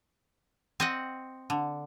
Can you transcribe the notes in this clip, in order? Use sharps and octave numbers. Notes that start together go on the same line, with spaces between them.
C4 D#5 F#5
D3